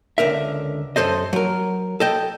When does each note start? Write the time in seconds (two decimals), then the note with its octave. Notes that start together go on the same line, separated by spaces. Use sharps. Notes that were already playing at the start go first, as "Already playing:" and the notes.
0.18 C#2 D3 A#4 E5
0.96 F#2 E3 A4 C5 D#5
1.33 F#3 A#4
2.00 A4 D#5 G5